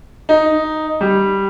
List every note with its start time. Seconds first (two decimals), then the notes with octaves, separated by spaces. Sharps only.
0.29 D#4
1.01 G3